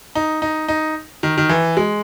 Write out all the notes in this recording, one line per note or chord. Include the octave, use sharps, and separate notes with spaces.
D#4
D#4
D#4
D#3
D#3
E3
G#3